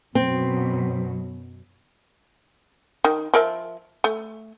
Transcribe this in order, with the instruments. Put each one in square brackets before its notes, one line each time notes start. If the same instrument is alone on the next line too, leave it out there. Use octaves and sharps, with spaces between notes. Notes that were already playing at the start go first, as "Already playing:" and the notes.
[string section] F#2 B2 F#3 [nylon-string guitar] C4
[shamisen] D#3
F3 A#4 E5
A3